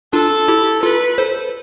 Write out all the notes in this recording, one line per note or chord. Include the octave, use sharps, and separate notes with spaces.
D4 F4 A4
E4 G4
F4 A4 B4
A4 C5